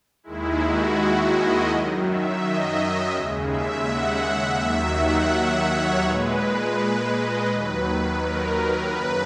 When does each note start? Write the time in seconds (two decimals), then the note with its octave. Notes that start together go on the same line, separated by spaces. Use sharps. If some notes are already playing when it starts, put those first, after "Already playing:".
0.24 D#2 D#3 G#3 E4
0.61 F#4
1.32 D#5
1.69 F#2 D#3 F#3
2.05 E5
2.41 D#5
3.13 D#2 C#3 G#3
3.50 E5
3.86 F#5
4.58 D#2 D#3 F#3 E5
4.94 F#5
5.30 E5
5.67 C#5
6.03 A#2 G#3 B4
7.12 D#5
7.48 D#2 D#3 F#3 B4
8.21 A#4
8.92 F#2 C#3 B4